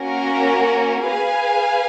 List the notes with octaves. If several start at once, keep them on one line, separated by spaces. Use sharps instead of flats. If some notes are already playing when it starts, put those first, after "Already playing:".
Already playing: A#3 C#4 F#4 A#4
G#4 B4 F5 G#5